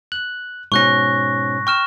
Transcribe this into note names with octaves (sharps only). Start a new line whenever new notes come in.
F#6
G#2 B2 C#4 C#6 F#6 A#6
G5 C#6 F6 E7